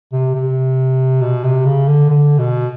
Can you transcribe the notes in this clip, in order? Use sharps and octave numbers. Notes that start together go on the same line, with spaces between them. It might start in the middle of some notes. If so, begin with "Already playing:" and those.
C3
C3
B2
C3
C#3
D3
D3
B2